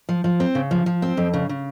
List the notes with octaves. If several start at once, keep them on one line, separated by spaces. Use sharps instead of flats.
F3
F3
C4
C#3
F3
F3
C4
F2
C#3
C#3